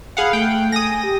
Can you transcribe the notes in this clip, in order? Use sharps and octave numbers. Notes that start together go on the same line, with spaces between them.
G#4 F5 F#5 B5
A3 G5
G#5 D#6 A#6
G4